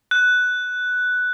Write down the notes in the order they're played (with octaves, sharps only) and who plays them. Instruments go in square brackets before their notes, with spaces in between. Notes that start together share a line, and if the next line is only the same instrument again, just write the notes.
[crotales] F#6